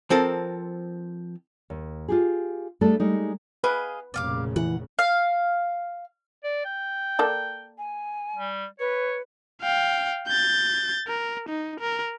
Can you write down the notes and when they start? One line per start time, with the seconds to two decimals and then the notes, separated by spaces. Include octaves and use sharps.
0.10 F3 C4 A4 A#4
1.70 D#2
2.08 F4 G4 G#4
2.81 G3 A3 D4 G#4 A4
3.00 G3 G#3 D#4
3.64 G#4 B4 D#5 F5
4.14 F1 A#2 C#3 D5 F5 D6
4.56 E3 F#5
4.99 F5
6.44 D5
6.65 G5
7.19 A#3 A4 D5
7.78 G#5
8.36 G3
8.80 B4 C#5
9.62 F5 G5
10.28 G6 A6
11.08 A#4
11.49 D#4
11.80 A#4